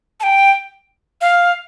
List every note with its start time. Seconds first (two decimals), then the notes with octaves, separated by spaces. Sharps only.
0.20 A5
0.23 G5
1.21 F5